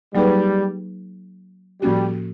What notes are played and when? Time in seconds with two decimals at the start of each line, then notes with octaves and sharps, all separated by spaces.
0.14 F#3 G3 A#3 D#4 G#4 B4
1.81 A2 F3 G3 A#3 C#4 F#4